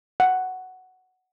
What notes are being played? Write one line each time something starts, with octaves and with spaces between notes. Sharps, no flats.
F#5